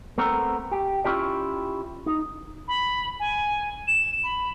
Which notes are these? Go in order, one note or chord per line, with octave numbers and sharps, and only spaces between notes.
A3 B3 C4 A#4
G4
C#4 E4 F4 G4 D5
D#4
B5
G#5
E7
B5